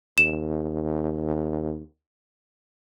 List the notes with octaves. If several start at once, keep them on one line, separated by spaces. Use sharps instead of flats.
D#2 E7